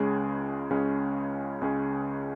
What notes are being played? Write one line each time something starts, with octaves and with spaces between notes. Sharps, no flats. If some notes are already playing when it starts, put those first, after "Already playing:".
Already playing: C#2 C#3 G#3 C#4 G#4
C#2 C#3 G#3 C#4 G#4
C#2 C#3 G#3 C#4 G#4